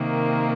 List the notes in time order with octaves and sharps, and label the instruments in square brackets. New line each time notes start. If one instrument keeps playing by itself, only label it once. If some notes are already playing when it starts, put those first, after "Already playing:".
Already playing: [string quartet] C3 D#3 A#3